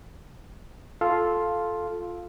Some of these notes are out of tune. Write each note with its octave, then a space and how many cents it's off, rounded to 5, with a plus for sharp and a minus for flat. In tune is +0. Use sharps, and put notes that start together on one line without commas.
F4 +5 A4 -10 F5 +0